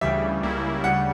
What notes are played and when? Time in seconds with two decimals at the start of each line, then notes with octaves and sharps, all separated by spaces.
0.01 D2 C#3 E3 G3 E5
0.43 C#2 C#3 G3 A#3 E4
0.84 D2 C#3 G3 F#5